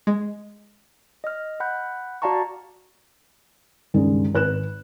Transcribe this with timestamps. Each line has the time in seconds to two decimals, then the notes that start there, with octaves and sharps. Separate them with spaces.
0.07 G#3
1.24 D#5 F6
1.60 F#5 B5 F#6 G6
2.22 F#4 D5 F5 A5 A#5 C#6
3.94 C#2 G2 D#3 G#3
4.34 G#1 B4 F#6 E7